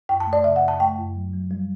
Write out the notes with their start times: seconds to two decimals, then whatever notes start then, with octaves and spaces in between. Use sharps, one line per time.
0.09 F#2 G5
0.20 A5
0.27 A3
0.33 D5
0.44 C#3 E5
0.56 F#5
0.62 F#2
0.68 A5
0.80 A3 G5
0.98 F#2
1.15 F#3
1.34 F#3
1.51 G3